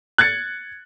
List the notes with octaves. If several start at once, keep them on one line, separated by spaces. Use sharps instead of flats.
F#6 G#6 A6 C#7